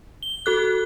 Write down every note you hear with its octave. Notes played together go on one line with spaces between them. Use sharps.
G7
F#4 A4 F#6